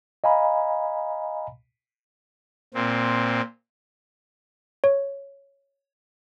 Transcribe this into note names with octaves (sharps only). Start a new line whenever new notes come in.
D#5 F5 G#5 A#5 B5
A#2 C4
C#5